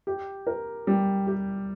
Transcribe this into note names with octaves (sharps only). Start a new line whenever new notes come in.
G4
A#4
G3
G4